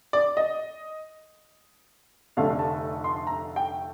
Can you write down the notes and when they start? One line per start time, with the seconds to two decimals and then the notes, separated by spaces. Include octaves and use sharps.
0.13 D5
0.37 D#5
2.37 F1 F2 D3 A3 F5
2.59 A5
3.04 C6
3.27 A#5
3.56 G5